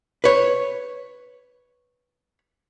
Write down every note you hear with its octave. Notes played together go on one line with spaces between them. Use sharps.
B4 C#5